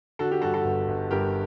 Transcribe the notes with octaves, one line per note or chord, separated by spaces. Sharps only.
D3 F#4 A4
G4
G2 F#4 A4
F#4 A4
G1
G1
G2 G4 A#4